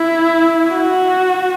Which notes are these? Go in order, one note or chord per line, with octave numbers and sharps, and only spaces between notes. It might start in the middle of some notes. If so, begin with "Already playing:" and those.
Already playing: E4
F#4